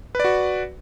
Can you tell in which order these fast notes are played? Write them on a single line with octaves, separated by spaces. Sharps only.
B4 D5 F#4